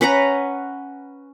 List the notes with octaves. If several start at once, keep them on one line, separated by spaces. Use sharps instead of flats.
C#4 B4 F#5 A#5